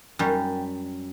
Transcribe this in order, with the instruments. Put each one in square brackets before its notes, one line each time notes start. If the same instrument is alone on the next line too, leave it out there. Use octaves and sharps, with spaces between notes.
[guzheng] F#2 G3